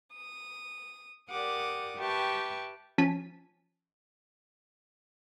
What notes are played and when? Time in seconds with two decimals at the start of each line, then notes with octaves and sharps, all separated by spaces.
0.14 D#6
1.30 G4 A#4 D5 F#5 D6 D#6
1.98 G4 B4 E5 G5 A5 C#6
2.98 F3 C#4 G#5 A5 B6 D#7